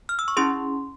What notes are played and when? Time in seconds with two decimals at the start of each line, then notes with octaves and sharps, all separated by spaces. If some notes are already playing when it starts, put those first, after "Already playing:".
0.09 F6
0.19 E6
0.28 C#6
0.37 C#4 E4 G#4 C6